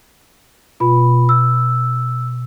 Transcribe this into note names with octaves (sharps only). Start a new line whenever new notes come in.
B2 F4 B5
E6